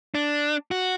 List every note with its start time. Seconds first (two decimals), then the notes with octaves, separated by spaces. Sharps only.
0.15 D4
0.71 F#4